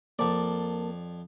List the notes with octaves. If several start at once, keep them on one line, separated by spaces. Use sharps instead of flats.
F2 A#3 A#4 D5 A5